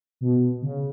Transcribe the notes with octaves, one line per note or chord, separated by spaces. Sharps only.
B2
C#3